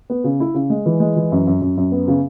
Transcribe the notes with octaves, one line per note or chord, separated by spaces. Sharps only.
B3
C#3
E4
C#3
G#3
E3
G#3
E3
F#2
F#2
F#2
F#2
B3
C#3